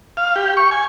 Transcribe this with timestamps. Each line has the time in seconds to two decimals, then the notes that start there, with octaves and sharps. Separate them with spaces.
0.17 F5
0.36 G4
0.57 C#6
0.71 G#5